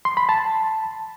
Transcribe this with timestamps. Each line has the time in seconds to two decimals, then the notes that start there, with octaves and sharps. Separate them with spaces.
0.05 C6
0.17 B5
0.29 A5